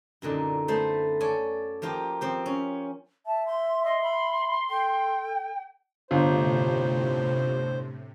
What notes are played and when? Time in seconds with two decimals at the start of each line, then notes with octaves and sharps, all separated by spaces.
0.22 F#2 A#2 D3 D#4
0.68 A3 B3 C5
1.20 A4 C#5 D5 G#5
1.82 F3 A#3 F4 G4
2.21 F3 C4 G4
2.46 C#4
3.26 E5 A5
3.46 C6
3.84 D#5 C6
4.03 B5
4.70 A4 G5
6.11 G1 A2 C3 F4 C5